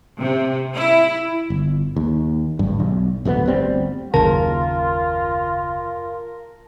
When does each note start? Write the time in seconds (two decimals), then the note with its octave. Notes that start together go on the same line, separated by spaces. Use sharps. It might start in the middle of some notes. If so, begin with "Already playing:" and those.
0.20 C3
0.75 E4
1.50 G1
1.96 D#2
2.59 D1 G#1 G2
2.80 B1
3.25 D1 D2 G#3 B3
3.46 G1 D2 G3 C4
4.14 F#1 D#2 C#3 F4 A#4 A5